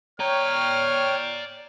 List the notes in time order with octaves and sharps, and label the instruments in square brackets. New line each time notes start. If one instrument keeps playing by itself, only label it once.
[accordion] C#5 G5 [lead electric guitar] D5 A#5 [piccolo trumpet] F6